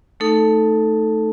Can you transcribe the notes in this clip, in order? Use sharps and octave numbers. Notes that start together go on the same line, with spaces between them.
A3 D#4 A4